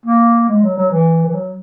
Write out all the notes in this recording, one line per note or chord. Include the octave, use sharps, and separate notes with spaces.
A#3
G#3
F#3
F#3
E3
E3
F#3